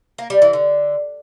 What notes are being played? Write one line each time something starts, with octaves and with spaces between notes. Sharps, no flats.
A#3
G3
E3
D3